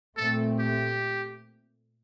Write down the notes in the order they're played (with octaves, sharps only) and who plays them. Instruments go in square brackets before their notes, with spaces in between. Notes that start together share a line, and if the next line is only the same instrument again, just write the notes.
[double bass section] A#2 A3 C4 [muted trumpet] A4
[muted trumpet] G4